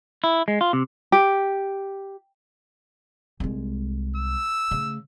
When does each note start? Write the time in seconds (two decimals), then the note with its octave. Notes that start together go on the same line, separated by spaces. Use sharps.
0.24 E4
0.48 G#3
0.61 F4
0.73 C3
1.12 G4
3.40 C2 G#3
4.16 E6
4.71 C#3 A3